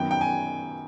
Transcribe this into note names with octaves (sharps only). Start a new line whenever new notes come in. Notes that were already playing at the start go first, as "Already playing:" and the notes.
Already playing: F#2 D#3 F#3 B3 G5
G5
G#5